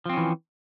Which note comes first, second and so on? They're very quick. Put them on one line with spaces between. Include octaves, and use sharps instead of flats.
F3 C4 C#4 E3